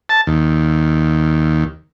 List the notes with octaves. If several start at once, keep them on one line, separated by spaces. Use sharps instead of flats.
A5
D#2